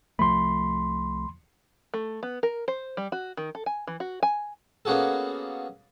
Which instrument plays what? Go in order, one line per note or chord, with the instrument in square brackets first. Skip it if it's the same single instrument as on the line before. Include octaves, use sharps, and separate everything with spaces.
[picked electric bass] C2 F3 A3 [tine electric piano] B5 C6
[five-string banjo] A3
B3
A#4
C5
G3
F#4
D#3
A4
G#5
E3
F#4
G#5
[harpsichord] A#3 B3 C#4 F#4 G#4 A4